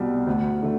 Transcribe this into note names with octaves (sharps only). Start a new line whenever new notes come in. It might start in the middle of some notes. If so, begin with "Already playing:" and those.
Already playing: C2 B2 G3
D2
D3 A3